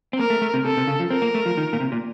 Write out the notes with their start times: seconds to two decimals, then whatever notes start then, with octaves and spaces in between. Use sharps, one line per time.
0.13 C4
0.19 A#3 A#4
0.30 A3
0.42 A3
0.54 C3
0.65 C3 A4
0.77 C3
0.87 C#3
1.00 F3
1.10 C4 A#4
1.22 A#3
1.35 A3
1.46 F3
1.57 D#3
1.73 A#2
1.80 C3
1.92 A#2